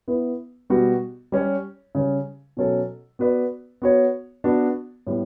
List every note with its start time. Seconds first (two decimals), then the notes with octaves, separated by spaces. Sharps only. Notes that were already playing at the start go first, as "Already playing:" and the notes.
0.08 B3 E4 B4
0.70 B2 G3 B3 F#4
1.32 G3 C#4 G4 C#5
1.95 C#3 G3 C#4
2.57 B2 F#3 C#4 F#4 A4
3.19 B3 F#4 B4 D5
3.82 B3 F#4 C#5
4.44 B3 D4 F#4
5.07 A2 G3 B3